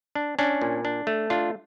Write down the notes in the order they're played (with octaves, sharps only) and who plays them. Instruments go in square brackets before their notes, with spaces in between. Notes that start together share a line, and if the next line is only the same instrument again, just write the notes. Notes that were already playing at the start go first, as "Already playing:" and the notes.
[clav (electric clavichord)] D4
C#4 D4
A#2
D4
A3
D4 F4